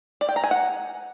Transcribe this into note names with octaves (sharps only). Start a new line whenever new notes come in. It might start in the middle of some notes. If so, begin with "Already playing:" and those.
D5
G5
A#5
G#5
F#5